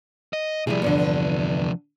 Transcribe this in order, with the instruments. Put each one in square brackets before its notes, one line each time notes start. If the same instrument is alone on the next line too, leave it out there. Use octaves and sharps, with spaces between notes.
[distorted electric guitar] D#5
[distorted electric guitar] C3 F3 [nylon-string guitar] G3 E4 G#4
[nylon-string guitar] E2 G2 D3